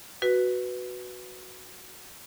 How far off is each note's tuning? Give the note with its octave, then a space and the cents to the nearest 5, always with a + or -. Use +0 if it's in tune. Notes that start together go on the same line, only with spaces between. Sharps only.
F#4 +0 B4 +0